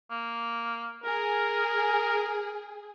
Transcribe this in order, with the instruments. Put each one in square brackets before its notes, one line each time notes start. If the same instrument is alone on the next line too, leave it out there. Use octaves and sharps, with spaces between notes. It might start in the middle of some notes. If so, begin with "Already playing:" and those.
[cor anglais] A#3
[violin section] G#4 [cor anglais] A#4